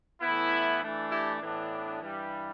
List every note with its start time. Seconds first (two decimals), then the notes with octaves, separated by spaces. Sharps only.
0.21 A2 E3 B3 E4
0.81 E3 A3 D4
1.11 E4 G4
1.42 A2 E3 B3 D4
2.02 G2 E3 G3